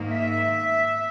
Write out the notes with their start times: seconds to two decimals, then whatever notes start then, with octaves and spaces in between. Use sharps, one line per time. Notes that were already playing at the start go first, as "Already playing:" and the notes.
Already playing: G#2 D#3 A#3
0.11 E5